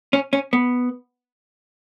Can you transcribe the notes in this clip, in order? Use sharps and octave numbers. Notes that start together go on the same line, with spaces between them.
C#4
C#4
B3